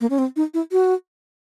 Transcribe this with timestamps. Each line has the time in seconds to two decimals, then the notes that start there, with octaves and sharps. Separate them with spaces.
0.01 A#3
0.10 C#4
0.18 C4
0.36 D#4
0.54 E4
0.72 F#4